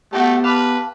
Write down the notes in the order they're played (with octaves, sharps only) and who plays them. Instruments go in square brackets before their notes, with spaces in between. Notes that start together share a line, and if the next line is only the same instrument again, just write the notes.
[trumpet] A3 [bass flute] B3 [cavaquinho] F#4 G5 A5 [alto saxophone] G4
[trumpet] B4 [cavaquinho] F5 A5 D6